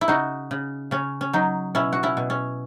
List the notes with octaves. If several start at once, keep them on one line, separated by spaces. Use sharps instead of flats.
E4
C#3 D#4 F#4
C#3
C#3 C#4
C#4
F#3 D#4
B2 C#4 E4
F#4
C#4 E4
B2
C#4